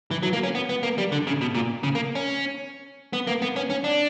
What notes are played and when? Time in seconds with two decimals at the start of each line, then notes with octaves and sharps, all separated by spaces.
0.11 E3
0.23 F#3
0.33 A#3
0.43 C#4
0.55 B3
0.69 B3
0.83 A#3
0.98 G3
1.12 D3
1.27 C#3
1.41 B2
1.55 A#2
1.83 C#3
1.95 A#3
2.15 C#4
3.13 B3
3.27 A#3
3.42 B3
3.56 C#4
3.70 C#4
3.84 D4